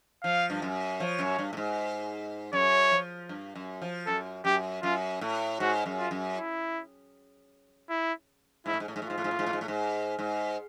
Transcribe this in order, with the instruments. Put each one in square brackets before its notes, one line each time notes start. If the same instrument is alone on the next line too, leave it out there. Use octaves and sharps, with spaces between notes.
[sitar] F3 [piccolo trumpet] F5
[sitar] G2
F#2
[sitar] F3 [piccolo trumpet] C#5
[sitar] F#2
G2
A2
G#2
[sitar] F#2 [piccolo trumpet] C#5
[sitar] F3
G2
F#2
F3
[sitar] F#2 [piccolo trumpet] A4
[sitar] F#2 [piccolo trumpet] G4
[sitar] F#2 [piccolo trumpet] F4
[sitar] A2
[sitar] G#2 [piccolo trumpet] F#4
[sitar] F#2
[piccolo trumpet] F4
[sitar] F#2
[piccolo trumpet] E4
E4
[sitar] G#2 [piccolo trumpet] E4
[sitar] A2
G#2
A2
G#2
A2
[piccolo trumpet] F4
[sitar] G#2
A2
G#2
A2
G#2
A2
G#2
A2
G#2
G#2